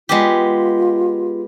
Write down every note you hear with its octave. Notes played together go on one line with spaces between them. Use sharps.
G#3 B3 F4 G4